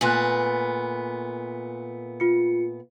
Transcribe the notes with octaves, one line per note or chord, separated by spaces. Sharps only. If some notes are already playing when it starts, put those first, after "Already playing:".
A#2 A3 B3 G#5 C6 F#6
F4 C#7